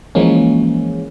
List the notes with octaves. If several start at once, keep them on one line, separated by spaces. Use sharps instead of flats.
E3 F3 G#3 A#3 C#4